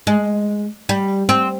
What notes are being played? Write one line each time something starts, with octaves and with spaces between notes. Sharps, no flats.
G#3
G3
C4